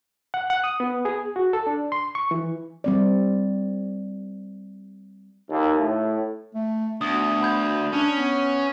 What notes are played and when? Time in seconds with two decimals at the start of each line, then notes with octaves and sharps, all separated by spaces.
0.34 F#5
0.50 F#5
0.64 D#6
0.80 B3
1.05 G#4
1.36 F#4
1.53 A4
1.67 D4
1.92 C6
2.15 C#6
2.31 E3
2.84 G3 C4 D5
5.49 D#2
5.78 A2
6.54 A3
7.01 D2 B3 D#6
7.43 B5 G6 G#6
7.93 C#4 D4
8.18 B3